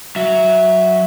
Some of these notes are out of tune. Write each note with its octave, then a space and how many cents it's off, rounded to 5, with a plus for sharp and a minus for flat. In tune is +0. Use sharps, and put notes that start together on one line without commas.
F#3 +0 E5 +0